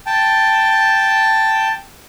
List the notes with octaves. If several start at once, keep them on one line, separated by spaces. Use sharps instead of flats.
G5 A5